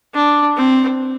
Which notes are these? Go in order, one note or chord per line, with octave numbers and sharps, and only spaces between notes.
D4
C4